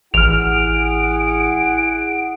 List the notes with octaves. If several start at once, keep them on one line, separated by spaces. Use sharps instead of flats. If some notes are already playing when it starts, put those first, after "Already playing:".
A1 E4 G#4 F#5 F6 D7 F7